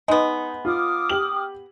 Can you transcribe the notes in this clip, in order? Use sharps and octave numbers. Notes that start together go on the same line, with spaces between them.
G#3 B3 D#4
F4 D6 D#6 F6
G4 F#7